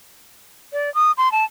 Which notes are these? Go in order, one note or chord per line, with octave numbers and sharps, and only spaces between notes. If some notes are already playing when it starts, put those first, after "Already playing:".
D5
D#6
C6
A5